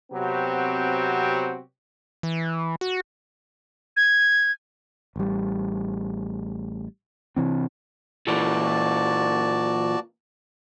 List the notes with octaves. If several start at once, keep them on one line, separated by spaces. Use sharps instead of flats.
C3 F#3 B3 C4 F#4 G4
E3
F#4
G#6
A1 G3
C3 E3 C4
A#2 E3 F#4 D5 A5